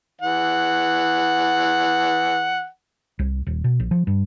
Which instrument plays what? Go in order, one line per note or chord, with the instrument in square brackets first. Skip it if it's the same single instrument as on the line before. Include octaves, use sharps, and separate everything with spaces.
[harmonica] E3 F#5
[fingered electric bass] C2
D#1
B2
A#1
F3
G2